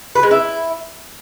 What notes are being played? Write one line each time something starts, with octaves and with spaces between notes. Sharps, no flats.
B4
G#3
E4